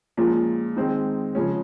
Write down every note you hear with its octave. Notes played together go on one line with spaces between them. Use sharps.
A#2 F3 G#3 C#4 F4
D#3 G#3 C4 D#4
C#3 F3 G#3 C#4